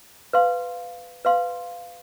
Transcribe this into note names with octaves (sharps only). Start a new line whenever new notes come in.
B4 F5 C6
B4 F5 C6